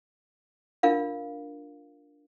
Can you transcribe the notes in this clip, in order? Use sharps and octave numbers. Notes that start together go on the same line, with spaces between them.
D4 F4 A#4 F5